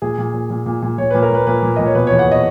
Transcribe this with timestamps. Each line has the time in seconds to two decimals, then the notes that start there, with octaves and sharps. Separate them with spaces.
0.02 A#2 G#4
0.18 A#2
0.34 A#2
0.50 A#2
0.66 A#2
0.82 A#2
0.98 A#2 C#5
1.11 A#2 B4
1.22 A#4
1.31 A#2 B4
1.47 A#2 B4
1.62 A#2
1.76 A#2 D#5
1.86 C#5
1.95 B2 B4
2.07 E2 C#5
2.19 F#5
2.27 B2 D#5